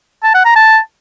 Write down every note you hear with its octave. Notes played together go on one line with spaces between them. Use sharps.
A5
F#5
A#5
A5